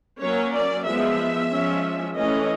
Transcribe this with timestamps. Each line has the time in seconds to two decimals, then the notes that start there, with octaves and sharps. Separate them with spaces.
0.21 F#3 A#3 C#4 C#5
0.54 D5
0.86 F3 G#3 B3 E5
1.52 F3 G#3 C#4
2.16 E3 A3 C#4 D#5